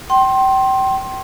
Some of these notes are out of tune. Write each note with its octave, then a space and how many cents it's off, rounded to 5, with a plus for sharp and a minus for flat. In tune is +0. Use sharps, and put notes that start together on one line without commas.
G5 -30 C6 +20